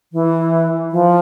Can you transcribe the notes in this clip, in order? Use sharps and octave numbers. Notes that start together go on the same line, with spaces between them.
E3
F3